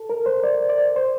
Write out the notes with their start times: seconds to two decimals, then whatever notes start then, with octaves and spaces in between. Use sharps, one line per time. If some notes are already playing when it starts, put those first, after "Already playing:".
Already playing: A4
0.10 A#4
0.26 C5
0.43 D5
0.69 D5
0.96 C5